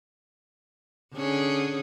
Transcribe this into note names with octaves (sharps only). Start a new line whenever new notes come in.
D3 C#4 G#4